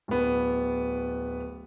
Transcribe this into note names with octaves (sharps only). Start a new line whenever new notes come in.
D1 B3